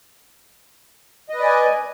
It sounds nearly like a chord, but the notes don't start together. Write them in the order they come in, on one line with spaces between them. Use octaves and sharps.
D#5 B4 D5 G#5